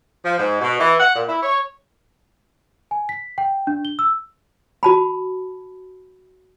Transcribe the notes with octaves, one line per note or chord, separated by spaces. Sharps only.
F3
G#2
B2
E3
F#5
A#2
E4
C#5
G#5
B6
G5
D4
G7
E6
F#4 A5 B5